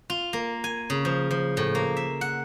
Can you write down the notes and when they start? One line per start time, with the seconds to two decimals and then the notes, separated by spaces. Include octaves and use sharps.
0.10 F4
0.33 A#3
0.64 G#5
0.90 C#3
1.05 F3
1.31 F3
1.57 A2
1.75 A#3
1.97 E5
2.21 F#5